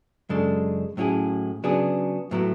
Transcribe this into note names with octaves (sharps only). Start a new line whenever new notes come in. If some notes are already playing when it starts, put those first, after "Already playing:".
F#2 C#3 G#3 D4 A4
A2 F#3 C#4 E4 G#4
C#3 F#3 B3 D4 G#4
A2 F#3 B3 E4